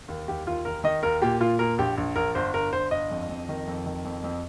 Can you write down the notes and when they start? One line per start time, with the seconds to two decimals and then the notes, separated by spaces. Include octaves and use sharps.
0.08 D#2
0.28 D#2 G4
0.46 D#2 F4
0.65 D#2 A#4
0.84 D#3 D#5
1.03 D#2 A#4
1.22 A#2 G4
1.40 A#2 F4
1.59 A#2 A#4
1.78 A#1 G4
1.98 A#1
2.16 A#1 A#4
2.35 G1 C5
2.53 G1 A#4
2.73 G1 C5
2.91 G1 D#5
3.11 F2
3.30 F2
3.49 D#3
3.67 F2
3.86 D#3
4.05 F2
4.24 F2